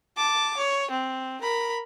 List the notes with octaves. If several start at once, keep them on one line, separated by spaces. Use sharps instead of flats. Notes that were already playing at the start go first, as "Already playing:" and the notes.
A5 D6
C#5
C4
A#4 B5